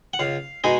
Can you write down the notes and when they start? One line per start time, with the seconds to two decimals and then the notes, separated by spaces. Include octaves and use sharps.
0.14 F#5
0.19 C#2 F5
0.64 B2 G#3 D#4 G#4